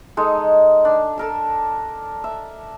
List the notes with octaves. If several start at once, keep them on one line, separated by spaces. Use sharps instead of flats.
G#3 D#4 A4
D4
A4 A#4 A5
E5